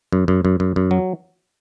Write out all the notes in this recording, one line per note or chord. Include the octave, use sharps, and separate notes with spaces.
F#2
F#2
F#2
F#2
F#2
F#3